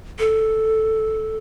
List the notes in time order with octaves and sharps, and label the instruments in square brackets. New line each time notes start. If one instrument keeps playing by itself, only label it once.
[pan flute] A4